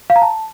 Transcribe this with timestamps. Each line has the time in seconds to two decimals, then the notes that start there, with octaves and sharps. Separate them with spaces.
0.10 F5
0.16 A#5
0.22 A5